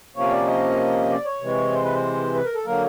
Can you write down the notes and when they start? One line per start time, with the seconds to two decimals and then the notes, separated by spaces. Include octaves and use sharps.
0.16 C3 F3 A#3 C#4 C#5
0.31 D5
0.47 D#5
1.10 D5
1.25 C#5
1.41 C3 E3 G#3
1.72 C5
1.84 B4
1.95 C5
2.35 B4
2.45 A#4
2.55 A4
2.66 D3 F#3 A#3 A#4